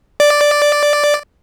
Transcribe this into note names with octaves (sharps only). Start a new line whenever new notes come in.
D5